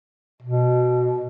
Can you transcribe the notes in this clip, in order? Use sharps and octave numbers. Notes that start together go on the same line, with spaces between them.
B2